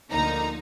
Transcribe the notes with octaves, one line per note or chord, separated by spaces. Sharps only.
D2 D3 F3 A#3 D#4 A#5